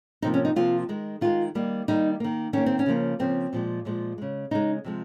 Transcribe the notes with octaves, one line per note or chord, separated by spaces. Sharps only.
C3 F3 A#3 D#4
C#4
D#4
C3 F3 A#3 F4
D#3 G#3
D#3 G#3 F4
D#3 G3 A#3
D#3 G3 A#3 D#4
D#3 A#3
D#3 A#3 C#4
C4
C#4
C#3 F3 A#3
C#3 F3 A#3 C4
A#2 F3 G#3
A#2 F3 G#3
C#3 G#3
C#3 G#3 D#4
C3 F3 G#3